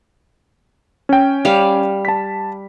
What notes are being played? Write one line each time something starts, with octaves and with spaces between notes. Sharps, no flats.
C#4 G5
G3 F5
A5 B6